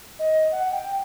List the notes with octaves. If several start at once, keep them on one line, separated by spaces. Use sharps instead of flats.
D#5
F#5
G5